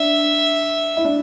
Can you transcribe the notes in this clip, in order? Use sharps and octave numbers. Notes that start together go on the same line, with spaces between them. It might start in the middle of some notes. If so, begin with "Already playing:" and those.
Already playing: D4 E5
E4
D4